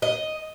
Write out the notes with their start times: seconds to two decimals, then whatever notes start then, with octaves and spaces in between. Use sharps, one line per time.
0.02 D#5